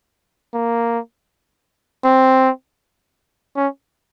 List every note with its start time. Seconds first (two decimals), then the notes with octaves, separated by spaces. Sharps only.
0.54 A#3
2.04 C4
3.56 C#4